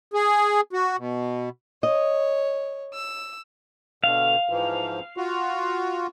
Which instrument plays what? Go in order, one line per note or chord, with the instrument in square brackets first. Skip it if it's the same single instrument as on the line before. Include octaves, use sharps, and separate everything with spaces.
[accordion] G#4
F#4
B2
[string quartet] C#5 [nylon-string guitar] D#5
[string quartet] E6
[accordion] B2 D3 [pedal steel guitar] F5
[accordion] G#2 E3 F3
F4 F#4